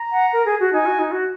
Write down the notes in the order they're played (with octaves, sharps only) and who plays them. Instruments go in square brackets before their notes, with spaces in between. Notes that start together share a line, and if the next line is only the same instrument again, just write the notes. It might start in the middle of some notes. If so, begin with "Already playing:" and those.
Already playing: [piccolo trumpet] A#5
[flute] F#5
A#4
G#4
F#4
[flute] D#4 [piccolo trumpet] G#5
[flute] F#4
D#4
F#4